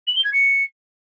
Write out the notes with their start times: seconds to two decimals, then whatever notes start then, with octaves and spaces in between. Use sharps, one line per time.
0.07 F#7
0.16 G7
0.24 G#6
0.33 C#7